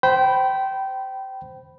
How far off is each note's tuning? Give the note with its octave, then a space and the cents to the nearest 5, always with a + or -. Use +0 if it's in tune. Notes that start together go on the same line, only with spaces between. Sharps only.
C5 -5 G5 -20 B5 +0